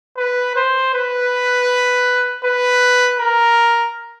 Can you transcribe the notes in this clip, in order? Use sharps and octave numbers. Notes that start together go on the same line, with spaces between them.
B4
C5
B4
B4
A#4